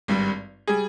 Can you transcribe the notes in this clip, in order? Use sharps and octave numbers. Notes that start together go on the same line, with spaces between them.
G#1 G2 G3
G3 G#4